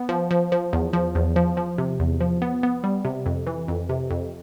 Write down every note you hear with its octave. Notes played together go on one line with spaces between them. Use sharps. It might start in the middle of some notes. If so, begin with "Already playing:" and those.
Already playing: B3
F3
F3
F3
E2
F3
E2
F3
F3
C3
E2
F3
B3
B3
G3
C3
F2
E3
F2
C3
F2